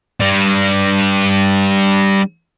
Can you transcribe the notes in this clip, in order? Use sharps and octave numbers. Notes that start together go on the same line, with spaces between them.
G3 D4